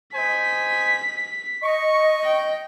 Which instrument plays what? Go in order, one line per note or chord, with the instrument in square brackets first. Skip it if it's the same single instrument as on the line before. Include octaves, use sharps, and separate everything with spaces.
[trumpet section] C5 D#5 G#5 [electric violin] B6
[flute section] D#5 [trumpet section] C#6
[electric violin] G5